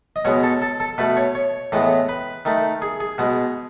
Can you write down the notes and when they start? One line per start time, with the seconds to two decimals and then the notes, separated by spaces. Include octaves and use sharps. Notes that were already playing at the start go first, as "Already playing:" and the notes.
0.16 D#5
0.25 B2 G#3 B3 C#5
0.43 A4
0.62 A4
0.80 A4
0.98 B2 A3 B4
1.17 C#5
1.35 C#5
1.72 A2 E3 G#3 B3
2.09 B4
2.45 D#3 A3
2.82 G#4
3.00 G#4
3.18 B2 G#3 B3